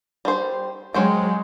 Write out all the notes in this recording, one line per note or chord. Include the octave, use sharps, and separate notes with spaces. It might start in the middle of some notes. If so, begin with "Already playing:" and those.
G3 C5
F#3 G#3 C#4 C5 G5